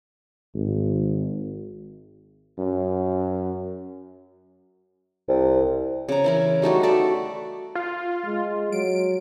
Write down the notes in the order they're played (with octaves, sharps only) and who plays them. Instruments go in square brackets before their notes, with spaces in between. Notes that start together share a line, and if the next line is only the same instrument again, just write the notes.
[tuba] G#1
[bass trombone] F#2
[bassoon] C2
[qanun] C#3 A#5
E3 E4 A#4
G3 A3 D#4 F#4
F#4 A4 D5 E5
[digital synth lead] F4
[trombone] G#3
[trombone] F#3 [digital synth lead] D7